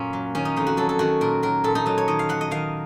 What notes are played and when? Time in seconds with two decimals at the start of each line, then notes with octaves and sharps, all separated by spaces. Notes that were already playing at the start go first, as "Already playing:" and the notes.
Already playing: F#2 A#2 A#3 C#4
0.13 F#3
0.35 D#3 C#4
0.45 D#4
0.56 F2 D#4
0.67 F#4
0.77 F#3 A4
0.89 A4
0.99 D#3 F#4
1.21 A#2 A#4
1.43 F#3 A#4
1.64 A#2 A4
1.75 D#4
1.86 F#3 D#4
1.98 C#5
2.08 D#3 D#5
2.19 F5
2.29 F#3 F#5
2.41 D#5
2.51 D#3 F5